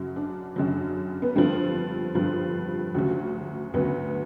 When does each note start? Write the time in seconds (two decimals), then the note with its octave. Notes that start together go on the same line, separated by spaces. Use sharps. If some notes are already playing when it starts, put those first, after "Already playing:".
Already playing: F#2 C#3 F#3
0.16 D4
0.56 F#2 C#3 F#3
1.22 B3
1.36 G2 D3 F3 C4
2.15 G2 D3 F3
2.94 D2 C#3 F#3
3.74 D2 C#3 F#3 B3